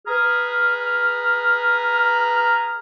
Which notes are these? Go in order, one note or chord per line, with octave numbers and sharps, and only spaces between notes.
G#4 B4 A#5 F6